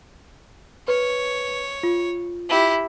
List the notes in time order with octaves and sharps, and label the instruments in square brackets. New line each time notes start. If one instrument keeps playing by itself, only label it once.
[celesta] B4 [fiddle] C#5
[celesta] F4
[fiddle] E4 G4